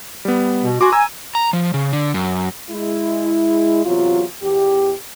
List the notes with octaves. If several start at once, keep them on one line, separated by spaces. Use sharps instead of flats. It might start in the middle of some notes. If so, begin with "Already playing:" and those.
G3 B3
B2
F#4 G#5 C6 D6
G#5 A#5 E6
A#5
F3
C#3
D3
F#2
G#3 E4
E2 C3 F#3 F4
E2 G4